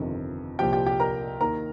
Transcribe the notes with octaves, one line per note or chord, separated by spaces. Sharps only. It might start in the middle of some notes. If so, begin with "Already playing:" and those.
Already playing: G1 F2 C3 D#3
C2 A#2 F3 G4 G5
G4 G5
G4 G5
A#4 A#5
D#2 D#3 A#4 A#5